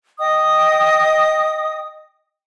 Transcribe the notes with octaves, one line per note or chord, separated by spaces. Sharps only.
D#5 G5 D#6